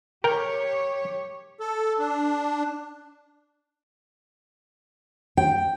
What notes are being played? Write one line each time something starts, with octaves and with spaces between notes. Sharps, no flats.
G4 A#4 C#5 G5
A4
D4
G5